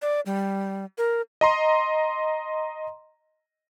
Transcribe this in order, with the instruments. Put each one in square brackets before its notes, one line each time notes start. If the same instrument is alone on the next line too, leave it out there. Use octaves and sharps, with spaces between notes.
[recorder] D5
G3
A#4
[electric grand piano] D#5 A#5 C6